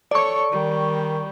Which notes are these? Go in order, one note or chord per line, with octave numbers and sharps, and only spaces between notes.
A4 C#5 D5 C#6
D#3 G3